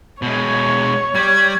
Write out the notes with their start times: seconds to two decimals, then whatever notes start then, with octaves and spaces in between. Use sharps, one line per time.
0.22 B2 G#3 C#5
1.15 G3 G#6